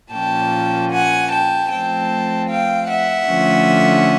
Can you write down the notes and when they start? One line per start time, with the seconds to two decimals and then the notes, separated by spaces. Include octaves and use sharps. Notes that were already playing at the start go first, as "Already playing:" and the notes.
0.12 A#2 F3 A#3 C#4 G5 A5
0.91 F#5 G#5
1.30 G5 A5
1.70 F3 A3 C4 G5 A5
2.48 F5 G5
2.88 E5 F#5
3.27 D3 F3 A3 C#4